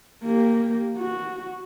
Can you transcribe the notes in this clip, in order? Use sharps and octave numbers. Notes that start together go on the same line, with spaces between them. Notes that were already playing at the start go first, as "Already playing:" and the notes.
A#3 G4
F#4